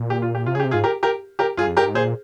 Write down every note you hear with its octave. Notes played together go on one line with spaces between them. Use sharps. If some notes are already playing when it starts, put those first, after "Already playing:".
Already playing: A#2
G4
F4
G4
C3 F4
C#3 G4 G#4
C3
G#2 F4 G#4
G4 A#4
G4 A#4
G4 A#4
G2 F4 G#4
F2
G2 G4 A#4
G#2
A#2 G#4 C5